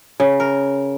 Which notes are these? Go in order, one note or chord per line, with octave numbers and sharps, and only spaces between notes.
C#3
A#4